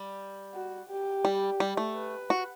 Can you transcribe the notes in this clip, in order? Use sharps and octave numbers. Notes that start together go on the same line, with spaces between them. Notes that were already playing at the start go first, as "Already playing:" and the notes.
Already playing: G3
F#4
G4
G3
G3
A3
B4
F#4